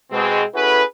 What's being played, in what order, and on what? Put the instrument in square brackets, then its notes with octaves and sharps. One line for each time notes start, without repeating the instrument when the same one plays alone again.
[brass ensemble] B2 G#3 C4
C#4 E4 F#4 G#4 A4 B4